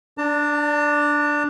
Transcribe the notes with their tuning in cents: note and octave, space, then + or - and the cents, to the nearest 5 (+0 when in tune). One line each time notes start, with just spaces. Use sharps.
D4 +0 A5 +40